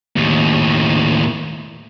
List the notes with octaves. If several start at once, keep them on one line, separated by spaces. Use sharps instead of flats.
D#2 A2